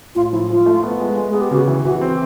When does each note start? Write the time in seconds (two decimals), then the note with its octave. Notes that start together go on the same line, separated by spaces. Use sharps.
0.15 A2 F4
0.32 F3 E4
0.49 F3 F4
0.66 A3
0.84 B3
1.00 G#3
1.17 G#3
1.30 B3 G#4
1.41 G4
1.51 C#3 F#4
1.68 E3
1.85 E3 F#4
2.01 C4